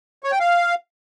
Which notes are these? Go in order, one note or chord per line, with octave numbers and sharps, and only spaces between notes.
C#5
G5
F5